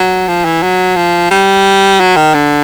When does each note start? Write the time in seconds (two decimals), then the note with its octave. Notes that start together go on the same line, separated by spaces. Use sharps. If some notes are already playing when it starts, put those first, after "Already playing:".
Already playing: F#3
0.28 F3
0.45 E3
0.63 F#3
0.96 F3
1.31 G3
2.00 F#3
2.16 D#3
2.34 D3